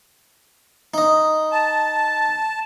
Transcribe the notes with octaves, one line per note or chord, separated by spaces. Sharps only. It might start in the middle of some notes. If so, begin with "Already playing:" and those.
D#4 D#5
A5